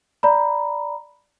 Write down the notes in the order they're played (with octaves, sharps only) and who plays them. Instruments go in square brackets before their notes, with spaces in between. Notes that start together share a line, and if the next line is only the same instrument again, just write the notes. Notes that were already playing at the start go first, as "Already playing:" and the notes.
[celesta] D5 A#5 B5